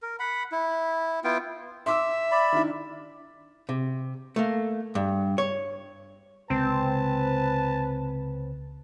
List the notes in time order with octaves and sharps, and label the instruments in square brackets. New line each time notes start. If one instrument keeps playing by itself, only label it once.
[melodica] A#4
F#5 B5
E4
B3 E4 F4 G5
[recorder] E5 [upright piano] C6 D6 E6
[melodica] D5 B5
[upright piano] D#3 D4 E4
[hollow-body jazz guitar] C3
A3 A#3
G2
C#5
[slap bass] C#2 C3 [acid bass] C4 [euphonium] B4 [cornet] A5